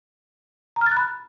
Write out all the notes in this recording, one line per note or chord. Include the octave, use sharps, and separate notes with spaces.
A#5
F6
A6
F#6
B5